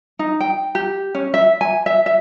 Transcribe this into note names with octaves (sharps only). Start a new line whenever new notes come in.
D#4
G5
G4
C#4
E5
G#5
E5
E5